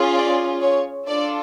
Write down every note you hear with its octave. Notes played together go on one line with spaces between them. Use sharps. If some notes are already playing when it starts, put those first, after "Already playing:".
Already playing: C#4 F4 G#4
D5
C#5
D4 F4 A4 D5